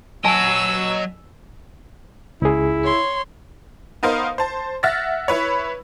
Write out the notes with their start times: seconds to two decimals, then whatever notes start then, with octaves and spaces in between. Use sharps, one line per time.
0.25 F#3 D#5 F#5 G#5 A5 E6
2.42 C#2 E4 G#4
2.84 C#5 C6
4.03 B3 D#4 A#4 C5 F5
4.38 C5 A5
4.83 E5 F#5 E6 F6 A6 A#6
5.28 E4 B4 C#5